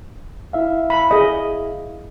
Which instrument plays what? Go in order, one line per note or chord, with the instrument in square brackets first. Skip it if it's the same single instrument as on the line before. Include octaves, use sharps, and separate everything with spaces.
[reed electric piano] E4 E5 F5
[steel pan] B5
G#4 D#5